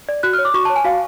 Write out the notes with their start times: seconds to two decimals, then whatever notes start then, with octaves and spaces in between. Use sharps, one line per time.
0.09 D5
0.23 F#4 F#6
0.33 F6
0.39 C#5
0.45 D6
0.54 F#4 C#6
0.65 A5
0.70 C#5
0.76 G#5
0.85 F#4 F5